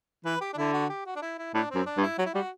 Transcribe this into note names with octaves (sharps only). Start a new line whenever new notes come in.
E3 B4
G4
D4
D3 E4
F#4
G4
F#4
D4
E4
E4
A2 D4
F#2 C4
D4
G2
E4
F#3 F#4
E4
G3 F#4